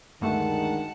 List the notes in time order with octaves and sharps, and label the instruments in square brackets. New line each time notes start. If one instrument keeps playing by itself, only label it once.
[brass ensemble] D2 D#3 G#3 [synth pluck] G2 A3 [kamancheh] F#5 A5